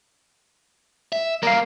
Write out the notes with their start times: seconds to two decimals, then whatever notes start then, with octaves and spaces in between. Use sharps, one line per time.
1.13 E5
1.43 G3 A#3 A#4 F5